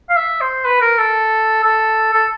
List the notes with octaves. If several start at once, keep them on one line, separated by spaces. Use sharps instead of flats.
F5
E5
C5
B4
A#4
A4
A4
A4